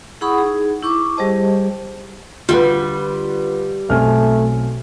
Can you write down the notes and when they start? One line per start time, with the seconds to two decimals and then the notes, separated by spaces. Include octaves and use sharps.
0.21 E4 G#4 F#5 B5 C#6 D#6
0.38 D#4 G#4
0.83 E4 C#6 D6
1.17 G3 G4 G#4 C5 D#5 A5
2.49 D3 G3 F4 F#4 B4
3.90 B1 A3 C4 G#5 F6